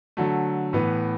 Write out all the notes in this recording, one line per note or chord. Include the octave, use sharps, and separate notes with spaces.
D3 F#3 A3
A2 E3 B3